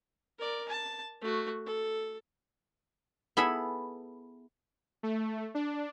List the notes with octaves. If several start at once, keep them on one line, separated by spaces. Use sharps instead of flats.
A#4 D5
A5
A3 F#4
A4
B3 E4 G#4 A4 E5 B5
A3
D4